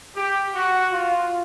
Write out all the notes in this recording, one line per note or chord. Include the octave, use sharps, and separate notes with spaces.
G4
F#4
F4